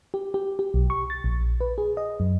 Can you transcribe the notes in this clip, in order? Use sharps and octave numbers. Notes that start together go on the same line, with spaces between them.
G4
G4
G4
B1
C#6
A6
A#1
B4
G#4
D#5
F#2